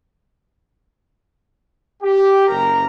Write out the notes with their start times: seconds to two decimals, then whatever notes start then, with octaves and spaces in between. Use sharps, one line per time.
2.03 G4
2.48 F#1 A#4 A#5